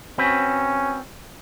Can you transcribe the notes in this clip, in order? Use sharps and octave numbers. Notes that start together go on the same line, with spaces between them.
C4 C#4 F#4 B4